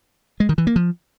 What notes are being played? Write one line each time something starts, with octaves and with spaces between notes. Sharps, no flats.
G#3
D#3
E3
A#3
F3